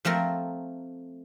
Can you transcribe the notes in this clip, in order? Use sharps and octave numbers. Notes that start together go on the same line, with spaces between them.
F3 A3 C4 A#4